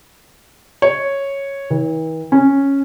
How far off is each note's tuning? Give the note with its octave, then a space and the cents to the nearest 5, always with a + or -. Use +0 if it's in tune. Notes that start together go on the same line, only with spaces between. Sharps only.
C#5 -5
E3 -45
C#4 -5